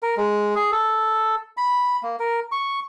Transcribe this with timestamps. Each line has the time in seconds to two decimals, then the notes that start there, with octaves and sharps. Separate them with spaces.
0.03 A#4
0.17 G#3
0.55 G#4
0.72 A4
1.57 B5
2.03 A#3
2.19 A#4
2.52 C#6